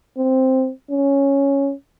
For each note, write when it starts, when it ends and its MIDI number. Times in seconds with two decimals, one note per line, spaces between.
0.18 0.71 60
0.91 1.73 61